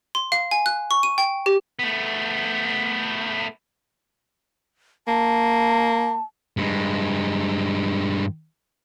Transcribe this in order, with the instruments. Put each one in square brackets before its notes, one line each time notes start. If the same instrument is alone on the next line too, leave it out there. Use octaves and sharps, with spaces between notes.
[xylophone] C6
F5
G#5
F#6
C#6
D#7
G5
G4
[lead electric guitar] A3 B3
[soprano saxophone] A#3 [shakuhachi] A5
[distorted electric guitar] G2 G#3